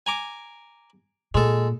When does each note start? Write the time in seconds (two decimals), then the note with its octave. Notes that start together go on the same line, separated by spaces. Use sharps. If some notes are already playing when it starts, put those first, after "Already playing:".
0.06 G#5 A#5 D6
1.34 A#2 G#3 A4